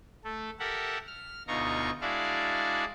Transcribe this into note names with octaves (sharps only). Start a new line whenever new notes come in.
A3 A4
G4 A4 A#4 E5 F#5
F6
D2 B2 D#4 F4 A#5 C#6
G#3 D4 E4 F#4 D5 F5